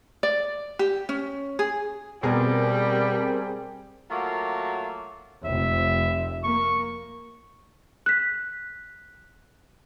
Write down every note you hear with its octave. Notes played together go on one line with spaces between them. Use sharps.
D5
G4
C#4
G#4
B2 G3 C4 G#4 A#4
F#3 A3 A#3 F4 F#4
F1 E5
A#3 C#6
F#6 B6